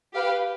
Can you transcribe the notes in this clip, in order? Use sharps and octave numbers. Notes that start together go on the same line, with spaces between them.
G4 B4 F5